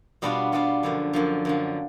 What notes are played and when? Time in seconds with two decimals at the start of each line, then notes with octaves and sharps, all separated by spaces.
0.22 B2 G3 B3 D4 F4
0.52 B2 G3 B3 D4 F4
0.83 F#2 D3 F3
1.13 F#2 D3 F3
1.45 F#2 D3 F3